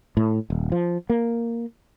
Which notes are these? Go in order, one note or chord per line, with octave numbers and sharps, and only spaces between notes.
A2
D#1
F3
A#3